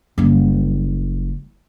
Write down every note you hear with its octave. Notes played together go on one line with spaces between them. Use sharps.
F#1 G3